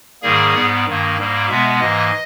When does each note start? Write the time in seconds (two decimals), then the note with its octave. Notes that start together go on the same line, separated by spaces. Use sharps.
0.23 G#2 D#3 G3 A#3 G#4
0.54 G#2 G3 B3
0.86 G2 D#3 A#3
1.17 G#2 G3 A#3
1.48 B2 G#3 B3 E5
1.80 G#2 E3 A#3 D#5